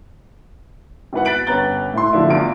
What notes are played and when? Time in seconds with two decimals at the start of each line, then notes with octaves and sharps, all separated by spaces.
1.13 G#1 E4 B4 F#5
1.25 F#6 A6 B6 D7 F#7
1.46 G1 C#4 B4 A#5 A6 G7
1.93 A2 E4 C6
2.13 D3 F3 A3 D4 E4
2.30 E2 E3 F4 D7